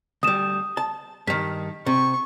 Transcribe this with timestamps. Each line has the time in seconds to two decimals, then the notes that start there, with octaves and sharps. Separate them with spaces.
0.23 D2 G3 D#6 E7
0.77 A5
1.27 G2 D#3 B6
1.86 C3 C#6